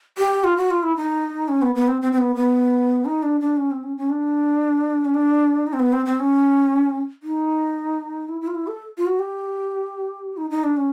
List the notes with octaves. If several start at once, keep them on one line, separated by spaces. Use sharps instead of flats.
G4
F4
F#4
F4
E4
D#4
C#4
B3
B3
C4
C4
C4
B3
B3
D#4
D4
D4
C#4
C4
C#4
C#4
D4
C#4
D4
D#4
C4
B3
C4
C4
C#4
D#4
E4
E4
F4
E4
A4
F4
F#4
G4
D#4
D#4
D4
C#4